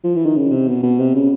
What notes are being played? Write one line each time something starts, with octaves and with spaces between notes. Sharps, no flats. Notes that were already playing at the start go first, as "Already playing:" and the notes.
F3
E3
D#3
C#3
C3
B2
B2
C3
C#3